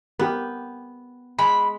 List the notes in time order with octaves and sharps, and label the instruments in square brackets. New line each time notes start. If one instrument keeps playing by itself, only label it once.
[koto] B3 [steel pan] G4 A#4
[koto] G#3 [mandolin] B5